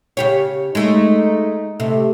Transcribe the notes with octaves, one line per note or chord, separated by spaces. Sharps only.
C#3 G4 C#5
G#3 A3 D#4
C3 A3